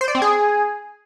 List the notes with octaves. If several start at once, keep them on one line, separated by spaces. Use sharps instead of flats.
C5
D5
C4
G#4